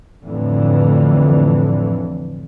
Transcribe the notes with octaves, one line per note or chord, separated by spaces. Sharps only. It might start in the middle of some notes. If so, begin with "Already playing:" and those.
F2 A2 D3 E3